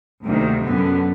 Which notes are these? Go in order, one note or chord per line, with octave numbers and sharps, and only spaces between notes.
D2 C3 D#3 A#3
F#2 D3 B3